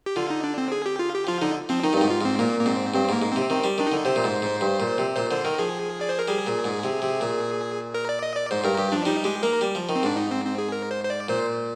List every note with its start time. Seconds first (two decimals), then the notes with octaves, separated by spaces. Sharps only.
0.06 G4
0.16 D3 F4
0.30 D#4
0.44 D4
0.58 C4
0.72 G#4
0.86 G4
0.99 F4
1.14 G4
1.27 F3 F4
1.42 D3 D#4
1.69 F3 C4
1.83 D#3 D#4
1.93 G2
1.97 G#2 D#4
2.10 F4
2.21 G#2 C4
2.39 A#2 A#3
2.60 A#3
2.66 G#2 C4
2.94 G2 C4
3.09 G#2 A#3
3.22 G#2
3.32 C3 C4
3.50 D#3 C4
3.64 G3
3.78 D#3 D4
3.87 D3 D#4
4.05 C3 C5
4.16 A#2
4.24 G#2
4.42 G#2
4.61 G2
4.80 A#2
4.98 C3
5.16 A#2 C5
5.30 D3 C5
5.44 D#3 A#4
5.59 F3 G#4
6.01 D5
6.09 C5
6.19 A#4
6.28 G3 G#4
6.47 A#2
6.64 G#2
6.84 C3
7.02 C3
7.21 A#2
7.94 A#4
8.09 D5
8.23 D#5
8.36 D5
8.51 G#2 C5
8.64 G2 A#4
8.78 G2 G4
8.92 F3 D4
9.05 G3 D#4
9.24 G#3 G4
9.43 A#3 A#4
9.61 G3
9.75 F3
9.89 D#3
9.95 C4
10.03 G#2 D4
10.17 D#4
10.31 C4
10.45 C4
10.58 G#4
10.72 A#4
10.91 C5
11.04 C5
11.10 D5
11.29 A#2 C5